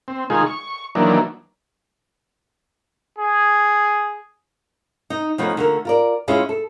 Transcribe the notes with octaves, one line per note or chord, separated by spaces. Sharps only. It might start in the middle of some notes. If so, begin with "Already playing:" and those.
C4
D#3 G#3 D#4 F4 G#4
C#6
D#3 E3 F#3 A#3 D4
G#4
D#4
F3 A3 B3 C#4 D#4
D3 A3 A#3 F4 A4 A#4
F4 A#4 D5
G#3 C#4 E4 F4 G#4
A4